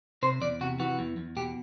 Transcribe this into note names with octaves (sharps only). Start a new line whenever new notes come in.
C3 C5
E2 D5
C3 F#4
E3 F#4
E2
E2
B2 G4